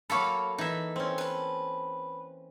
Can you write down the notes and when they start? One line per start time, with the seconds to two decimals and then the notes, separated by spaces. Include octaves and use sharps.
0.10 F#3 A#3 A4 C#5 F5 B5
0.58 E3 D#4 E5
0.96 C4 C#4
1.18 B4 A5